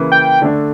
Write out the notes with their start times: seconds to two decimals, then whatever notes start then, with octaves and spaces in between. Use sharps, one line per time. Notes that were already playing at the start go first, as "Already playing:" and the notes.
Already playing: C#3 E3 A#3
0.12 G5
0.42 D3 A3 D4